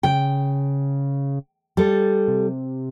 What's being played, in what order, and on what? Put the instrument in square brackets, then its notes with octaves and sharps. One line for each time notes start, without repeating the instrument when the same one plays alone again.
[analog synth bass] C#3 [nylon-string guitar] G5
[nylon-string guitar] G3 A4
[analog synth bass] C3